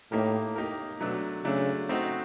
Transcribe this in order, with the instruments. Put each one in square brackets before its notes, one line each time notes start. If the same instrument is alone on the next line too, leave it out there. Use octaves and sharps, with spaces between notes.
[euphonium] A2 [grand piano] A#3 D#4 G4 A#4
[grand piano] A#3 D#4 G4 A#4
[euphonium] B2 [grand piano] F#3 A3 D4
[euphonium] C#3 [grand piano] F#3 A3 D4
[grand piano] A3 C4 D#4 F#4